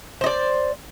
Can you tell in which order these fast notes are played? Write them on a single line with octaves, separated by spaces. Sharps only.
C5 D#5 D5